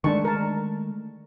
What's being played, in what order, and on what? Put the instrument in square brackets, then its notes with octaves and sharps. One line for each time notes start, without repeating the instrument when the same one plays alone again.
[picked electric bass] D#3 G#3 A3 [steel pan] D4 A5 C#6
[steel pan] A#4 A5